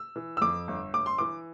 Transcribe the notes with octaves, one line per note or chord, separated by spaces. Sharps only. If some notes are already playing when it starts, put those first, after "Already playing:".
Already playing: E6
E3
E6
F2 D6
G1
G1 D6
C6
E3 D6